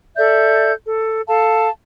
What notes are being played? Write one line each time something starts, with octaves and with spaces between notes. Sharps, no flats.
A4 D5 E5 G6
A4
A4 F5 A5